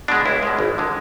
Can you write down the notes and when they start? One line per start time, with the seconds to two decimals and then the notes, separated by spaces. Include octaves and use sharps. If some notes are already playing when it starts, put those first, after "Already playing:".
0.08 B2 G#3 D4
0.26 C#2 E4
0.43 B2 G#3
0.59 G#1
0.78 D3 G#3